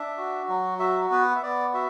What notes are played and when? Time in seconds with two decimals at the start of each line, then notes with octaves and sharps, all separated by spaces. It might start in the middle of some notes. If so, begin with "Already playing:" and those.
Already playing: D4 E5
0.17 F#4
0.49 F#3
0.79 F#4 E5
1.11 B3 B4
1.35 E5
1.43 B3 D5
1.73 F#4 E5